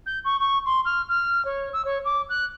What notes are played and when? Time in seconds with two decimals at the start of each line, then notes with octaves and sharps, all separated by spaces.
0.06 G6
0.25 C#6
0.40 C#6
0.66 C6
0.85 F6
1.09 F6
1.45 C#5
1.73 E6
1.85 C#5
2.05 D6
2.29 F#6